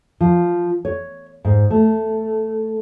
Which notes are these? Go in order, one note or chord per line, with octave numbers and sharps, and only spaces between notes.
F3
C#5
G#2
A3